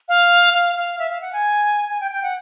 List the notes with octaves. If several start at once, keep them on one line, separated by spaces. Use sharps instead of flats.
F5
F5
F5
E5
F5
F#5
G#5
G#5
G5
G5
F#5